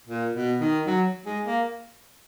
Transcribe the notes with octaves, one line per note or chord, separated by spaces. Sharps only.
A#2
B2
D#3
F#3
G#3
A#3